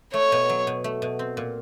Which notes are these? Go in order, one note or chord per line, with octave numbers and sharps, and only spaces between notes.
A3 C#5
B2
F#3
B2
A3
B2
C4
A#2